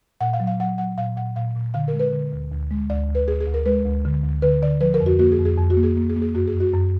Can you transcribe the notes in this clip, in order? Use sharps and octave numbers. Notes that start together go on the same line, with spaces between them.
A#2 F#5
F5
F#3
F5
F#3 F#5
F#3 F#5
A#2 F5
A#2 F#5
A#2 F5
A#2
D3 F5
A#4
G#3
B4
D3
D2
D2
G#3
D2 D5
D2
B4
D2 G#4
G#4
D2
A#4
G#3 B4
D2
D3
D2
D3 B4
D3 D5
F3 B4
A#4
F2
F#4
A#3 F#4
G#4
F2
G#4
F2
F#4
A#3
G#4
A#3
G#4
A#3
G#4
F#2 F#4
G#4
F#2
F#4
F#2